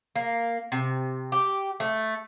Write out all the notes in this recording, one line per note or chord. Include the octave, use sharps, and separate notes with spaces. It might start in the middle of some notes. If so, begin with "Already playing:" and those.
A#3
C3
G4
A3